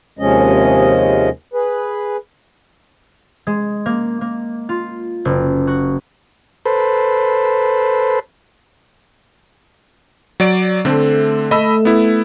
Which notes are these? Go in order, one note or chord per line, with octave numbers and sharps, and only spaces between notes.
D#2 C3 F3 G#3 C#4 D#5
G#4 B4
G#3
A#3
A#3
F4
F#1
F#4
A4 B4 C5
F#3 D5 D7
D3 A3 C4
A3 D#5 B5 E6
B3 E4